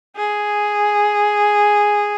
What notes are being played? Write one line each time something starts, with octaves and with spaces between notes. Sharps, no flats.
G#4